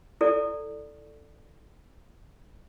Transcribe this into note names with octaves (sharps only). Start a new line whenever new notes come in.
E4 A4 D5